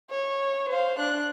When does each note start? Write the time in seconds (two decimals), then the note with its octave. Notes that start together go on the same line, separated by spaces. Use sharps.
0.10 C#5
0.69 C5 F5
0.99 D4 F#6